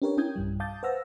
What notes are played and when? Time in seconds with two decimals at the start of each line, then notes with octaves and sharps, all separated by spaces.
0.02 C#4 D4 G4 A#4 B4 C#5
0.17 C#4 E4 G5 D#6 G6 G#6
0.36 B1 G2 G3
0.60 F5 A5 D6 D#6 G6 A6
0.83 B4 C5 F#5 E6 F6 A#6